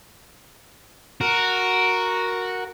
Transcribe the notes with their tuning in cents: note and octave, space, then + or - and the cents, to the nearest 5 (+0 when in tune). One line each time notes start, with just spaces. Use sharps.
F#4 -5 A#4 +0